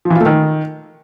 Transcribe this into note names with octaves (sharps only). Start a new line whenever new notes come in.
F3
E3
F4
A3
D#3